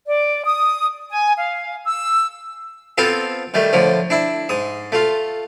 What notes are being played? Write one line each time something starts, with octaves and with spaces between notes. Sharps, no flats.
D5
D#6
G#5
F5
E6
B3 C4 F4 A4
D#3 G3 A3
A2 D3 F3
D4 E4
G#2 D#6
A3 F4